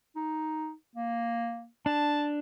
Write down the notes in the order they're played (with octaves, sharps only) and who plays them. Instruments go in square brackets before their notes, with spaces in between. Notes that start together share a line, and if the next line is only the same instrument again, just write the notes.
[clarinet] D#4
A#3
[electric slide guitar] D4 [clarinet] A5